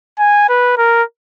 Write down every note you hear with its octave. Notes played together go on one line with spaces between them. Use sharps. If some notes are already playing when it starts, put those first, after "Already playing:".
G#5
B4
A#4